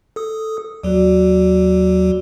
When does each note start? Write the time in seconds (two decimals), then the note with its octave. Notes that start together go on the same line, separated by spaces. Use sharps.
0.16 A4 D#6
0.83 D#2 F#3 F#4 D5